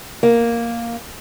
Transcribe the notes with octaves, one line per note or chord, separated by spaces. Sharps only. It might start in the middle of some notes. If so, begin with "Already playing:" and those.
A#3